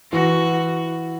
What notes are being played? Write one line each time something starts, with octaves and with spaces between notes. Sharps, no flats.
E3 F#4